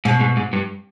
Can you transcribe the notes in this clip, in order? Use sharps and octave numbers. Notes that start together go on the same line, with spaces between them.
G#2 B2
G#2
G#2
G2